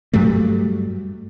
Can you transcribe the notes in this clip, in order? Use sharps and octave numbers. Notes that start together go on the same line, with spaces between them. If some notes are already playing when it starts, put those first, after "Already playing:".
G2 F#3 G3 A3